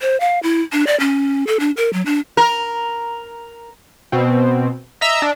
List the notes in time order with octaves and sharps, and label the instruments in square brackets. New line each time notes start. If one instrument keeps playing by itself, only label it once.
[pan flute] C5
F5
E4
D4
D5
C#4
A4
D4
A#4
F#3
D4
[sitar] A#4
[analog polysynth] B2 C4
D#5 E5 A#5 E6
D4